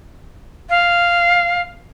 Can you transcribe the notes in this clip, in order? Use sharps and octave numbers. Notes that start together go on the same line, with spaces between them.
F5